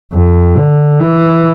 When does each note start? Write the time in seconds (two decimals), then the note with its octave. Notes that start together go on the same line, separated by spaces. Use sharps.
0.13 F2
0.57 D3
1.01 E3